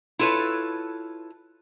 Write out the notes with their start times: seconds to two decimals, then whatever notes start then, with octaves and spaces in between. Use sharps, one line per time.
0.19 E4 F4 A4 B4 C#5